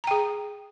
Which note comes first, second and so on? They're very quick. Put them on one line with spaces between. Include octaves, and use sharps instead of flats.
A#5 G5 G#4